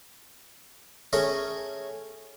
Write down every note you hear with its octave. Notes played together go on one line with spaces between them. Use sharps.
A3 C#4 G#4 A#4 C#5